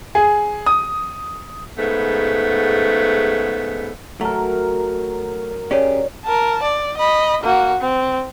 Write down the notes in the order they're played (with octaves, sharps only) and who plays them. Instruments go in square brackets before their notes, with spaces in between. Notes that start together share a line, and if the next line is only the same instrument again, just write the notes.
[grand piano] G#4
D#6
[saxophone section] G#2 C#3 A3 B3
[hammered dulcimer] F#3 A#4 [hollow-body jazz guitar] A3
[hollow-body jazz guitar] C#4 G4 G#4 [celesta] C#5 D5
[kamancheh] A#4 A5
D5
D#5 B5
A#3 F#4
C4